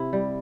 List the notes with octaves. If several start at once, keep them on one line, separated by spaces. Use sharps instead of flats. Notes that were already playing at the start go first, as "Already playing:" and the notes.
Already playing: C3 E4
G3